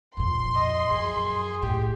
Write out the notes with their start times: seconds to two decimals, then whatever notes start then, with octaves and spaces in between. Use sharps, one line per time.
0.17 F2 A#2 C6
0.55 D#5
0.91 F#2 G#4
1.63 A2 G4